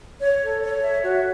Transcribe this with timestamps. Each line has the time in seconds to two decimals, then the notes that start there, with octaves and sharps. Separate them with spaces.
0.20 C#5
0.41 A4
0.62 C#5
0.82 E5
1.03 F#4